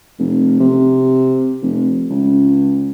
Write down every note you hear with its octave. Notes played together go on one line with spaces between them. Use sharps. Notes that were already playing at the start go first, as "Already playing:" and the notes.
F1
C3
F1
C#2